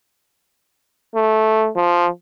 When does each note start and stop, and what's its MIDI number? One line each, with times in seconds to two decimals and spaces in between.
1.15 1.69 57
1.76 2.07 53